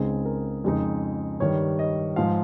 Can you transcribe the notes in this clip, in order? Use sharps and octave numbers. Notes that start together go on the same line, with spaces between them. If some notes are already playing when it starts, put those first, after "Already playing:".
Already playing: C#2 C#3 G#3 C4 D#4 G#4
A#4
F2 C#3 G#3 D#4
G2 D#3 G3 C#5
D#5
G#2 F3 F5